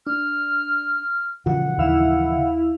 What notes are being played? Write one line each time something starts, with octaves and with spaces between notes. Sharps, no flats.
D4 F6
C#3 E3 F3 F4 F#4 F#5
D#2 E4 F5 E6